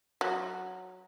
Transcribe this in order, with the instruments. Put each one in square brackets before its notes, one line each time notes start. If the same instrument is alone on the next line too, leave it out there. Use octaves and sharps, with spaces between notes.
[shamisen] F#3